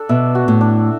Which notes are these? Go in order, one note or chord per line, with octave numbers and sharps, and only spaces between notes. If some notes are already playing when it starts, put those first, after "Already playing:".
Already playing: D4 A4
B2 E5
F#4
A2
D4